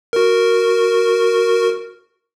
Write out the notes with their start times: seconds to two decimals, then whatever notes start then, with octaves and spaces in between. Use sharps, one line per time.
0.13 F#4 A#4